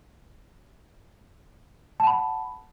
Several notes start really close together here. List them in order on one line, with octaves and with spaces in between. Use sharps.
A5 F#5 B5